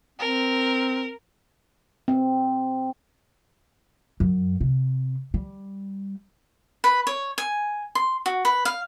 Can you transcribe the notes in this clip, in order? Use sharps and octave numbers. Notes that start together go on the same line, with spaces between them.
C4 A#4
C4
F#2
C3
G3
B4
C#5
G#5
C6
F#4
B4
F5